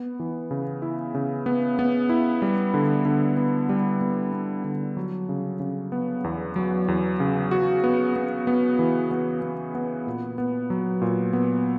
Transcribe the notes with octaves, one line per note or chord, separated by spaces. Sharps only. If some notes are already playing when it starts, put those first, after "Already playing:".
Already playing: B3
E3
C#3
E4
C#3
B3
B3
E4
G3
D3
D3
B3
G3
B3
B3
D3
F#3
C#3
C#3
B3
E2
F#3
E2
C#3
F#4
B3
B3
B3
E3
B3
B3
B3
A#2
B3
F#3
A#2
B3